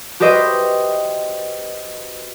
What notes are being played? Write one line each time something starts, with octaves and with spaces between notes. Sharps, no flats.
F#4 G4 B4 C5 D#5 E5